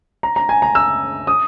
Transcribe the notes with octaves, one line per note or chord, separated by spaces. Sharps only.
A#5
A#5
G#5
A#5
E6
D#6